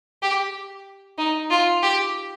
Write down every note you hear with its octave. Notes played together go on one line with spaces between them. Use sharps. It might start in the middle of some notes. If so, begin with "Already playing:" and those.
G4
D#4
F4
G4